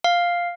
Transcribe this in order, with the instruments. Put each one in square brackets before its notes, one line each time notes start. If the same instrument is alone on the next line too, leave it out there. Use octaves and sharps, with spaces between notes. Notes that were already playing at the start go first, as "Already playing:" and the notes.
[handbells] F5